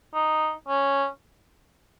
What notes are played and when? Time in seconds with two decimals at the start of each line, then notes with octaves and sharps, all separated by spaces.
0.14 D#4
0.68 C#4